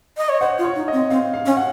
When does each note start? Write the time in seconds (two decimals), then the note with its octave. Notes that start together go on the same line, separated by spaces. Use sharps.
0.17 D#5
0.29 C#5
0.41 C5 F#5
0.58 F4
0.64 C#5
0.76 D#4
0.88 C4 D#5
1.10 C4 F5
1.34 F5
1.46 C#4
1.57 F#5